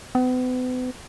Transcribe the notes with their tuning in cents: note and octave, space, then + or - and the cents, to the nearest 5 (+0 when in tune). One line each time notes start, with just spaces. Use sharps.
B3 +40